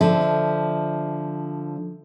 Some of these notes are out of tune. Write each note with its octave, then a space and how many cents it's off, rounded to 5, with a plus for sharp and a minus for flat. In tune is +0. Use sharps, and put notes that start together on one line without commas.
D3 +0 F3 +0 E5 -15